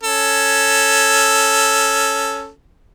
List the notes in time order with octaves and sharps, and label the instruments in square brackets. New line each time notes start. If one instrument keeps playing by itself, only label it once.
[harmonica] C#4 A4